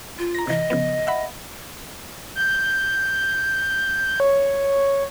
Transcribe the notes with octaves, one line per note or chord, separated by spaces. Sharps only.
F4
A#5 A#6
C3 E3 D#5
C#3 F3 B3
E5 F#5 B5
G6
C#5